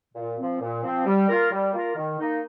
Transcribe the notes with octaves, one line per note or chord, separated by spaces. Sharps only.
A#2
F3 C4
A#2
F3 C4
G3
A#3 F4 A#4
G3
A#3 F4 A#4
D#3
A#3 D#4